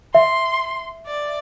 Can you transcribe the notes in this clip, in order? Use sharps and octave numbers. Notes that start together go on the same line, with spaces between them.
E5 C6
D5